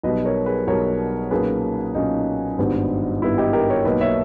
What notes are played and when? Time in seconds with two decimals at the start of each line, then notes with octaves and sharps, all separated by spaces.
0.03 B1 B2 G3 B4 D#5
0.25 A#4 C#5
0.46 G#4 B4
0.67 B1 B2 G3 A#4 C#5
1.31 B1 A#2 A#3 C#4 G#4 B4
1.95 B1 A#2 A#3 C#4 D#4
2.58 G#1 G2 G3 B3
3.22 G#1 G2 G3 B3 E4
3.38 D#4 G4
3.53 G4 A#4
3.70 A#4 C#5
3.85 B1 B2 A#3 B4 D#5
4.01 C#5 E5